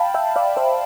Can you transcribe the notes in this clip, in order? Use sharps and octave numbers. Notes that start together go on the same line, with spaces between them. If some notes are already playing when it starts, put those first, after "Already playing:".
Already playing: F5 G5 A5 B5
E5 G5
D5 F5
C5 E5